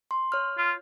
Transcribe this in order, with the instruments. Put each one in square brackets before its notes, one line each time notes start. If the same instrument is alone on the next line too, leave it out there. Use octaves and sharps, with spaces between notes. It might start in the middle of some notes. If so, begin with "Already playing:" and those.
[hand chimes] C6
C#5 F6
[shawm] F4